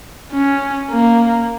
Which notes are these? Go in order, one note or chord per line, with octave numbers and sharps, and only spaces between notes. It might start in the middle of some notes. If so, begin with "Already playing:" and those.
C#4
A#3